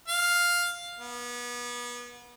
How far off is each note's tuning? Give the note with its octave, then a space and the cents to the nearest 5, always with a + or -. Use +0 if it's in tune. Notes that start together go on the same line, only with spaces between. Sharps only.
F5 +5
B3 -30